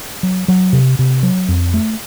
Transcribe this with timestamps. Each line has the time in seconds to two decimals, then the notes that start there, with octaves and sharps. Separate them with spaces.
0.23 F#3
0.48 F#3
0.73 C3
0.99 C3
1.23 F#3
1.48 F2
1.74 A3